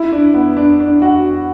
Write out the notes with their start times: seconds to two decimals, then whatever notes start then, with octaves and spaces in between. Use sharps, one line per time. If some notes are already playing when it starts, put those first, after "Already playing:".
Already playing: E4
0.12 D4
0.34 B3
0.57 D4
0.80 D4
1.02 F#4